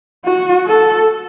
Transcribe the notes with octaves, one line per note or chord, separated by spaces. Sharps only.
F#4
A4